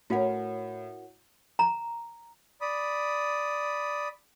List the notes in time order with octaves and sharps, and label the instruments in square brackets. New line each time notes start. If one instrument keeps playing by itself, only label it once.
[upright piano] A2 [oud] C#4 A#4 [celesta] E4 F#4 F#5
[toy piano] A#5
[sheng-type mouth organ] D5 B5 D#6